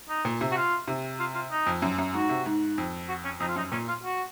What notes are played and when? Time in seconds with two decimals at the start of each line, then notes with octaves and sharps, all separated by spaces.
0.09 D#4
0.25 A#2
0.41 C3
0.51 F#4
0.57 F4
0.88 C3
1.20 F4
1.35 F4
1.51 D#4
1.66 F2
1.82 F#2
1.98 F#2
2.14 G#2 F#4
2.29 C3
2.46 G#2
2.78 F2
3.09 F#4
3.25 C#4
3.40 F2 D#4
3.49 F4
3.56 F#2 D#4
3.71 A#2 C#4
3.88 F4
4.03 F#4